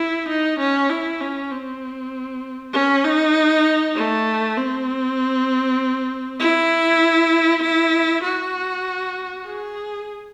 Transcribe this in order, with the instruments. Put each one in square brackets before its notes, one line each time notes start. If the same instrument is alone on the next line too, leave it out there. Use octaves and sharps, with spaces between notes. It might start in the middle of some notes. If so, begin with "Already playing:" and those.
Already playing: [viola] E4
D#4
C#4
E4
C#4
C4
C#4
D#4
A3
C4
E4
E4
F#4
G#4